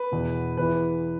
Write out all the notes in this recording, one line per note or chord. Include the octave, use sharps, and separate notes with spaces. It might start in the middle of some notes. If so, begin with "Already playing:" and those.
Already playing: B4
E2 B2
E2 E3 B4